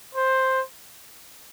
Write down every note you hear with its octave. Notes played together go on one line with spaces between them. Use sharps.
C5